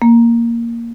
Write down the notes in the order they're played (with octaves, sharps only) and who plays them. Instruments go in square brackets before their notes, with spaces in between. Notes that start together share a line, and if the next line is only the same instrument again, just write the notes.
[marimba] A#3